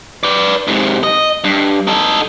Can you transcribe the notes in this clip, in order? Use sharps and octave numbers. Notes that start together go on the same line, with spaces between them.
B4 D5
G#2 C3
D#5
G2
D#4 A4